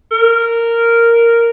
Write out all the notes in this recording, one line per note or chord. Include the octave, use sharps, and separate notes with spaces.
A#4